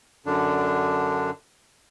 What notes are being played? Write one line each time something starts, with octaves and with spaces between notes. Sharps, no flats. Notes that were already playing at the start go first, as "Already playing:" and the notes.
F#2 D3 D4